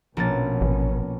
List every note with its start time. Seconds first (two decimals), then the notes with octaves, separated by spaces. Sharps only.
0.17 A#1 B2 A#3 B3 C#4 A6
0.61 A1